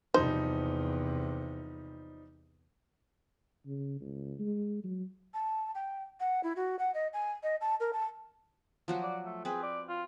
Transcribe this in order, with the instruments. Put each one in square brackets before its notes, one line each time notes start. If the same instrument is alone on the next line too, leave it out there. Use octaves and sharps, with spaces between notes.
[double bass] E2 C3 [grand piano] F3 G3 D#4 [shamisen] C5
[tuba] C#3
C#2
G#3
F#3
[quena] A5
G5
F#5
E4
F#4
F#5
D#5
G#5
D#5
A5
A#4
A5
[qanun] F3 F#3 F#4
[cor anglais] D5
A3
[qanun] C4 B4 [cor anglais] G#4
[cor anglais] D5
F4